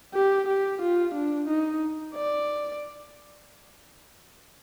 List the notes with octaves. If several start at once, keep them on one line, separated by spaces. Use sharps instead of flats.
G4
G4
F4
D4
D#4
D5